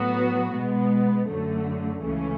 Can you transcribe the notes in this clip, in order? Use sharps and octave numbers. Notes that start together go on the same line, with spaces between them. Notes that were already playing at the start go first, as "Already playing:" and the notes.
Already playing: A2 F#3 B3 F#4
B2 G#3 B3
F#2 D3 F#3 A3
C#2 C#3 E3 A3 C#4